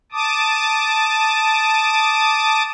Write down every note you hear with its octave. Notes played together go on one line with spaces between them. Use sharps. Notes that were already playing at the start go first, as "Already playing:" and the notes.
A5 D6 D#6